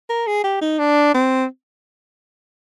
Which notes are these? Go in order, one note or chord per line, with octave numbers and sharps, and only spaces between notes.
A#4
G#4
G4
D#4
D4
C4